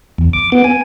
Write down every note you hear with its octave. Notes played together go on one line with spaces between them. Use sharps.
E2
D6
B3
G#5